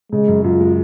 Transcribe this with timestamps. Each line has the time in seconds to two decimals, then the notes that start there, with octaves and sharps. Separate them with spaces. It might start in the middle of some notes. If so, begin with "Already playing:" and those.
0.12 C#3 G#3
0.28 F#2
0.44 F#2 F4
0.60 G#3